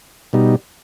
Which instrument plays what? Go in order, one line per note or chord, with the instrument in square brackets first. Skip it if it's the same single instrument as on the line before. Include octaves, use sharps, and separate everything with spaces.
[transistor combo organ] B2 G3 D#4